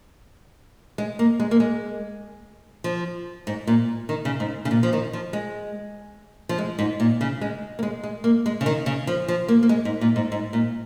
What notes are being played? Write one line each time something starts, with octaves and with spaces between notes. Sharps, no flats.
G#3
A#3
G#3
A#3
G#3
F3
G#2
A#2
D#3
C#3
G#2
C#3
A#2
F3
D#3
F3
G#3
F3
G#3
G#2
A#2
C#3
G#3
A#3
G#3
G#3
A#3
G#3
C#3
D#3
C#3
F3
F3
A#3
A#3
G#3
G#2
A#2
G#2
G#2
A#2